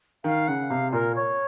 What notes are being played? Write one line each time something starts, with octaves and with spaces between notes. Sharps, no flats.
D#3 F5
C#3 F#5
C3 F5
A#2 A#4
C#5